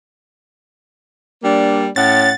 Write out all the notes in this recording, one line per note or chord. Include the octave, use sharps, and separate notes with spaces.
G3 A#3 D4
A2 C#4 F#5 A6